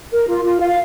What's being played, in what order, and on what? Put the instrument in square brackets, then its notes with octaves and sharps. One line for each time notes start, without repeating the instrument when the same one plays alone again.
[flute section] A#4
F4
F4
F5